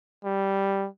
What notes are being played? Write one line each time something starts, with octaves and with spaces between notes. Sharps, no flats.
G3